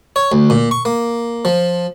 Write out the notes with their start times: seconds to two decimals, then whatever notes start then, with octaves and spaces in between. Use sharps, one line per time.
0.16 C#5
0.32 D2
0.50 A#2
0.71 C#6
0.85 A#3
1.45 F3